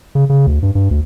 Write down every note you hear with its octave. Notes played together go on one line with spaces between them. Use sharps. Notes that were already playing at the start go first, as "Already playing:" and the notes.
C#3
C#3
D2
G2
G2
D2